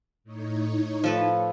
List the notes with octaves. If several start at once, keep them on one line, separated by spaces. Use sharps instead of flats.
A2 D#4 C#5
F3 A4 B4